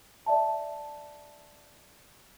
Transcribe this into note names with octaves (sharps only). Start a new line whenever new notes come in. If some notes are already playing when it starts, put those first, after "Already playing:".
D5 E5 A5